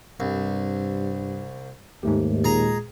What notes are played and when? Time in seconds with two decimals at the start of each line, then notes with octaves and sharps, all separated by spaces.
0.20 C2 G2
2.03 D#2 G#2 A3 G4
2.44 A#2 G#3 G#4 A#5